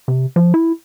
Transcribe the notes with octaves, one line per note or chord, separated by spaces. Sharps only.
C3
F3
E4